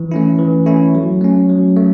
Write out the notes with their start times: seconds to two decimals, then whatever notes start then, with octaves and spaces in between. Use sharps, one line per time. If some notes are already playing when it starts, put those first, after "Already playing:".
Already playing: E3
0.11 A3 C#4 E4
0.38 E3
0.66 A3 C#4 E4
0.95 F#3
1.21 A3 C#4
1.49 F#3
1.76 A3